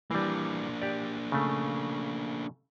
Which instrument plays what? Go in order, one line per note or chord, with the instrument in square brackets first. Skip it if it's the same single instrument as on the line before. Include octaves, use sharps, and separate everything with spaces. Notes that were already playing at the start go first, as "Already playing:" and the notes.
[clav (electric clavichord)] E3 G3 [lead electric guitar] A#3 D4
[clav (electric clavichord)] G4 D5
C#3 A3